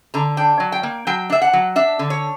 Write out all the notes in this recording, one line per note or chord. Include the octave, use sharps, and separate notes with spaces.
D3 A#5
D4 G5
F#3
G5
A#3
F#3 G5
D4 E5
F#5
F#3
D4 E5
D3
C#5